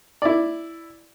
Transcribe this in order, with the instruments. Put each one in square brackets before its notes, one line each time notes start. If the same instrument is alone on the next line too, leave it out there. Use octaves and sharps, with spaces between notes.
[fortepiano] E4 D5